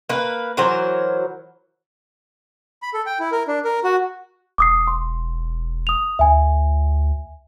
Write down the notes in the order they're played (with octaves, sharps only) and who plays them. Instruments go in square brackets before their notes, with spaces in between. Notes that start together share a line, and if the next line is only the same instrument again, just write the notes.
[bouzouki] A#3 B4
E3 F#3 A#4 C5
[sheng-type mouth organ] B5
A4
G5
E4
A#4
D4
A#4
F#4
[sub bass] E1 [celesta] D6 D#6 C7
[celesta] C6
D#6 F7
[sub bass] D2 [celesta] E5 G#5